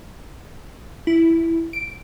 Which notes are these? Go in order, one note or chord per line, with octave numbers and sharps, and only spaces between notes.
E4
D7